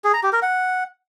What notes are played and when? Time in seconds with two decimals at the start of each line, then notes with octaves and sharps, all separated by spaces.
0.04 G#4
0.14 A#5
0.23 G4
0.33 A#4
0.42 F#5